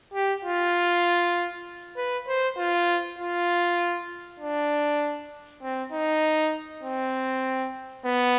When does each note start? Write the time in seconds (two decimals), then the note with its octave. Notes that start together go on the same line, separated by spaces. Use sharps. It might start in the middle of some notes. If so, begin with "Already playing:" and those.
0.14 G4
0.45 F4
1.96 B4
2.28 C5
2.57 F4
3.19 F4
4.40 D4
5.62 C4
5.92 D#4
6.83 C4
8.05 B3